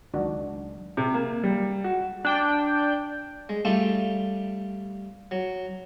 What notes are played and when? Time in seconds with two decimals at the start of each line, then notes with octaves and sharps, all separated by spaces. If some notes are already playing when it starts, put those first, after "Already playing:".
0.14 C#2 D#3 F#3 G#3 D4 F#4
0.97 C3
1.14 A#3
1.44 G3
1.84 F#4
2.25 D4 G5
3.49 G#3
3.65 G3 A3 D4 F4 G4 A4
5.31 F#3